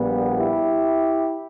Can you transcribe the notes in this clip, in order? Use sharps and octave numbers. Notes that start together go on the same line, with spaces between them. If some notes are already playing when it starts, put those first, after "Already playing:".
Already playing: A#1 A#2 G3 B3
E4 G4